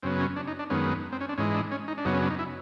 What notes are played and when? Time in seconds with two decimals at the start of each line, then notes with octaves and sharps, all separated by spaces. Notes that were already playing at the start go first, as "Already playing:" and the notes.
0.03 F#2 C#3 F#3 B3 C4
0.20 C#4
0.36 D4
0.48 D#4
0.59 D4
0.70 F#2 D#3 G#3 B3 C#4
1.12 C4
1.21 C#4
1.29 D4
1.38 G#2 E3 G#3 C#4
1.54 D4
1.71 C#4
1.88 D#4
1.98 D4
2.05 F#2 C#3 F#3 B3 D#4
2.13 C#4
2.22 D4
2.30 D#4
2.39 E4